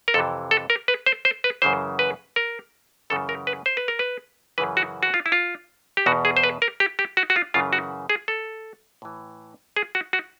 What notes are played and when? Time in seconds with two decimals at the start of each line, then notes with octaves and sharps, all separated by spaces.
0.08 A#4
0.14 F2 C3 E3 A4
0.51 A4
0.70 A#4
0.88 B4
1.06 C5
1.25 C5
1.44 B4
1.62 F#2 C#3 E3 C5
1.99 B4
2.36 A#4
3.10 F#2 C#3 E3 A4
3.29 A#4
3.47 B4
3.66 C5
3.77 B4
3.88 A#4
3.99 B4
4.58 F#2 C#3 E3 B4
4.77 F#4
5.03 F#4
5.14 F4
5.26 E4
5.32 F4
5.97 G4
6.06 E2 B2 F#4
6.25 G#4
6.37 C5
6.44 B4
6.62 A#4
6.80 G4
6.99 G4
7.17 F#4
7.30 F#4
7.36 F4
7.54 F#2 C#3 E3 F4
7.73 F#4
8.09 G#4
8.28 A4
9.02 A2 E3
9.76 G#4
9.95 F#4
10.13 F#4